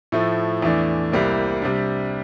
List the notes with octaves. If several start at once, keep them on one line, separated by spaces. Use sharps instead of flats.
A2 F3 A3
E2 E3 A3 D4
C2 C3 G3 A#3
C3 G3 D4